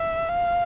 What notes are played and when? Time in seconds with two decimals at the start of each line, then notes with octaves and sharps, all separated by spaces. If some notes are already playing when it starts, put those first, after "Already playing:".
Already playing: E5
0.28 F5